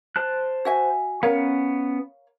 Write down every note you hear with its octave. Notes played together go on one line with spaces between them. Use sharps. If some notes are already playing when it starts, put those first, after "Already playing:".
C5 A5 F#6
F#4 E5 G#5
B3 C#4 A#4 C#5 F5